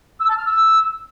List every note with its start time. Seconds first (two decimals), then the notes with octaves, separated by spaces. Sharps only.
0.20 E6
0.28 A5
0.37 F6
0.46 E6